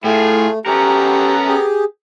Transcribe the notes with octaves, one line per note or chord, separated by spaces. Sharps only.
A2 A3 F4 G#4
B3 C#4 G4 A4 A#4 A#5
G4 G#4